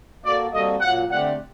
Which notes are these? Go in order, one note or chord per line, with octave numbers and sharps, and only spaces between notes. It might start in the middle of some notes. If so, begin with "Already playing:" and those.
A#3 F#4 A4 D5
C3 G3 A#3 F#4 A4 D#5
A#2 F#3 A#3 F#5
D3 A3 C4 G4 D5 F#5